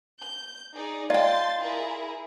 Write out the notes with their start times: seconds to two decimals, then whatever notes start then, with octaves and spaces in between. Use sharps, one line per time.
0.20 G6
0.73 D#4 G#4 D5
1.10 F4 D5 D#5 G5 A5 C6 A6
1.57 E4 G#4 A#4